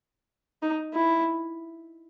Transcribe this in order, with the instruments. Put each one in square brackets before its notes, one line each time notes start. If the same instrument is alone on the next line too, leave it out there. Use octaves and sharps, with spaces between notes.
[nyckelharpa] D#4
E4